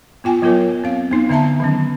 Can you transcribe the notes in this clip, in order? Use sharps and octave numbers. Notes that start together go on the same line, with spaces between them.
B3 F4 G5 G#5
F#3 B3 F4 A#4 C#5
C4 F5
B3 D#4
D3 B3 E5 A5 A#5
D#3 F#3 C#4